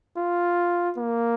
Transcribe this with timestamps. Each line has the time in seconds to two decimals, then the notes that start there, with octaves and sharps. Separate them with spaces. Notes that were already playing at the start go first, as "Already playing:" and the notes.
0.17 F4
0.98 A#3